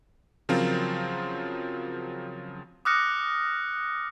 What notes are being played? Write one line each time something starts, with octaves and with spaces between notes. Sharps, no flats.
C#3 F3 F#3 C4 F4 A#4
D6 D#6 F6 F#6 A#6 C#7